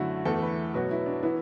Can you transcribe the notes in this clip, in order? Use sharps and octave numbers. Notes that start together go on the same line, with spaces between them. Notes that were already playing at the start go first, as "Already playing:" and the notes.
Already playing: F#2 D3 A3 E4 F#4
E2 E3 A3 A4
B4
B2 F#3 B3 F#4
E4
D4
E3 B3 E4